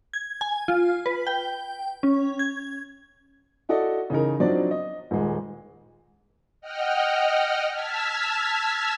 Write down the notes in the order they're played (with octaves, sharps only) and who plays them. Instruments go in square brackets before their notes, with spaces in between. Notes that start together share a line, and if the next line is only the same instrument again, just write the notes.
[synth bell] G#6
G#5
F4
B4
G5
C#4
G#6
[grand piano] E4 F#4 A4 D5 D#5
C#3 E3 D#4 A#4
F3 F#3 C4 D4 D#4 D5
D#5
D#1 G#3
[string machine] D#5 F#5 G5 F6
A5 E6 F6 G#6 B6